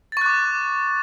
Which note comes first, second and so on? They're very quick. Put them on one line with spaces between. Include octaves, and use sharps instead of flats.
A6 C#6 F#6 D6